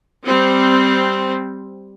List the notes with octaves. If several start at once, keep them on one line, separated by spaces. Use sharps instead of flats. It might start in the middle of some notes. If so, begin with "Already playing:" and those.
G3 C4